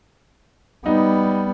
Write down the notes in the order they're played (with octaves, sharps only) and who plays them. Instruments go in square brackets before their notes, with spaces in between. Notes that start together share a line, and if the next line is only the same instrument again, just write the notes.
[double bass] G3 B3 [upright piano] D#4